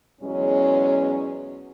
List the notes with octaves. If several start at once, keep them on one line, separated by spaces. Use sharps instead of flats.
E2 B2 F#3 G#3 C#4